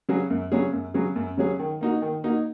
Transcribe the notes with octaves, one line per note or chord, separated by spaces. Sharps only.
C#3 F#3 C#4 G#4
F#2
C#3 F#3 C#4 G#4
F#2
C#3 F#3 C#4 G#4
F#2
C#3 F#3 C#4 G#4
D#3
A#3 D#4 F#4
D#3
A#3 D#4 F#4